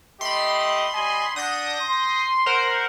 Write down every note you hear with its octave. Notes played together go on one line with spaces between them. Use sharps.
A3 G4 D#5 B5 C6
G3 D#5 G#5
D4 F#5 D#6 G6 A#6
C6
A#4 C5 F#5